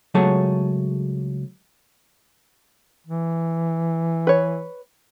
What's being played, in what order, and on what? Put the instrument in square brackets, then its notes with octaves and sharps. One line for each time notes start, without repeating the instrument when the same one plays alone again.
[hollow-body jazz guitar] C#2 F#3 A3 G#4 C#5 A5
[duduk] E3
[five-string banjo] B4 C#5